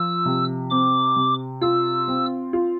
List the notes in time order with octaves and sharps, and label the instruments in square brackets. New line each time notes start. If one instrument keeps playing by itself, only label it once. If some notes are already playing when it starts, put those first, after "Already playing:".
Already playing: [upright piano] F3 F4 [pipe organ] E6
[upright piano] C3
[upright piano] C4 [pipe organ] D6
[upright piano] C3
[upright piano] F4 [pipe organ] E6
[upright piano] C4
F4